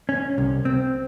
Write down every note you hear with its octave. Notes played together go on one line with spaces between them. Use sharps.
C#4
C2
C4